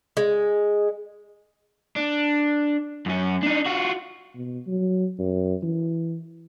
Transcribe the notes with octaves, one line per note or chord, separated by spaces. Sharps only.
G#3
D4
F#2 C#4
D4 D#4
F4 F#4
B2
F#3
F#2
E3